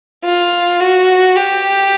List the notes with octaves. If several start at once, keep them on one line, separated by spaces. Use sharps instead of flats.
F4
F#4
G4